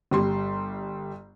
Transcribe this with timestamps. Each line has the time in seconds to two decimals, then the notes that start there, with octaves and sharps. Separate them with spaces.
0.11 G1 G3 C6